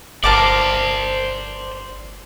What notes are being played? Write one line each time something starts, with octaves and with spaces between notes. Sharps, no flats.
G1 A#4 C5 D5 A5 D6